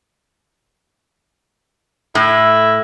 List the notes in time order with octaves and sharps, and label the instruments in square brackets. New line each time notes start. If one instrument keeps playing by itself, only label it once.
[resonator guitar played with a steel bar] A2 [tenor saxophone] E4